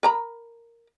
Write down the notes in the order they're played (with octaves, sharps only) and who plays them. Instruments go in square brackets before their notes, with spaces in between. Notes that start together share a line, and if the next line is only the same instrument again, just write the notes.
[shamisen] A#4 A#5 B5